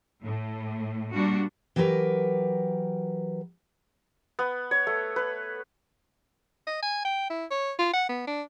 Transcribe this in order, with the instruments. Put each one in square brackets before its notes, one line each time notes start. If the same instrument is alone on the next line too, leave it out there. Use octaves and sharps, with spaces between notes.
[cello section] A2
A#2 G3 D4 F#4
[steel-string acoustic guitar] E3 F#3 G4 A#4 B4
[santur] B3
C#5
A3
B4
[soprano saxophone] D#5
G#5
G5
E4
C#5
F4
F#5
B3
D4